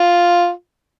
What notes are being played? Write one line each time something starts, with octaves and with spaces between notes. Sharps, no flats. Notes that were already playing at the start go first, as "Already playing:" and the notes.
Already playing: F4